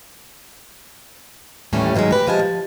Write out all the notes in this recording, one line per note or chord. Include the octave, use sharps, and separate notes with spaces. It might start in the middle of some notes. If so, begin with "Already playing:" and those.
D#2 A2 E3 G3 A3 C#4
G#2 D#3 F3 F#3 G#3
G4 B4
D2 F3 G#3 G#5 A5
F3